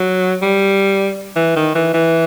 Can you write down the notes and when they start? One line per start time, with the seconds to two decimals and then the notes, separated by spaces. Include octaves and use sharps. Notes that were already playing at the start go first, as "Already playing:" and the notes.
Already playing: F#3
0.42 G3
1.36 E3
1.56 D#3
1.75 E3
1.94 E3